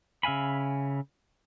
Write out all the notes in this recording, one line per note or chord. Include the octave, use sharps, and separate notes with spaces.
C#3 E5 F5 G#5 B5